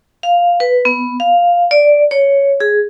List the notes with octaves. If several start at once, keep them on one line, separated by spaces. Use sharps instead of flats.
F5
B4
B3
F5
D5
C#5
G#4